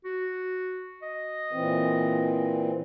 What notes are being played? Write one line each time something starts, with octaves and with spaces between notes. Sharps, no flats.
F#4
D#5
A#2 E3 C4